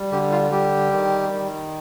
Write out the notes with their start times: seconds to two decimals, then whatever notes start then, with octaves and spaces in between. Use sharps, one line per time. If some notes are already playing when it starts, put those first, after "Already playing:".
Already playing: G3
0.12 D3 G4
0.32 F4
0.52 G3 G4
0.93 D#3
1.33 D#3